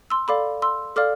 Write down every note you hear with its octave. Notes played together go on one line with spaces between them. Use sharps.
C6 E6
A4 D5 F5 B5 D6
C6 E6
A4 D5 F5 D6 F6